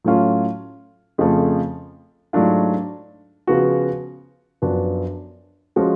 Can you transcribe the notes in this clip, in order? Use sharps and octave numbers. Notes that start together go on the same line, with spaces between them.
A2 F#3 A3 C#4 F4
F2 C#3 F3 A3
G#2 F#3 A3 D4 F4
C#3 F3 B3 F#4
F#2 F3 B3 D4 F#4
F3 G#3 C#4 F#4